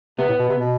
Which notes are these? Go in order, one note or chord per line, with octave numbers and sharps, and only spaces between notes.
C3 B3
A2
B2
C3
B2